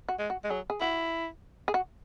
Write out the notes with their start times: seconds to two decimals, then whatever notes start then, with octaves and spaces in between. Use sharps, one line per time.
0.08 F#4
0.19 G#3
0.30 F#4
0.44 G#3
0.50 F#3 G#4
0.70 G#4
0.81 E4 F#4
1.68 G#4
1.74 F#4